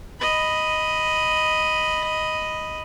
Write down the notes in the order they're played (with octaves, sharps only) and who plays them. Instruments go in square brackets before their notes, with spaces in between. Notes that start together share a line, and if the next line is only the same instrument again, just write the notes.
[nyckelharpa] D#5 B5